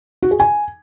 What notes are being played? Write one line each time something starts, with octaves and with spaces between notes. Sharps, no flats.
F#4
G#4
G#5